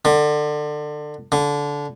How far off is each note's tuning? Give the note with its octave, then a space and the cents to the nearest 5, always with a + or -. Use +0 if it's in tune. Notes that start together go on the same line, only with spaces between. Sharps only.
D3 +25
D3 -20